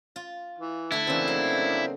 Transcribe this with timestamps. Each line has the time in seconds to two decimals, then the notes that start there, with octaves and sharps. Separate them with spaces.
0.16 F4
0.59 E3
0.92 D3 A3 E4
1.07 C#3 E3 A#3 C4 D4
1.28 F#3